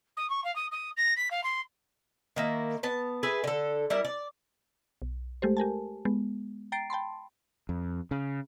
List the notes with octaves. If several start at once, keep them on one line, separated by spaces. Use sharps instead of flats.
D#6
C#6
F5
D#6
D#6
A#6
B6
F5
C6
D#3 A#3 E4
B3 A5
G#4 B4 E5
D3 A4
G3 E4 A#4
D5
B1
G#3 A3 G4 A4 C5
G4 A#4 G#5 A5
G#3 B3
G5 A#5 A6 C7 D7
G5 A5 B5 C6
F2
C#3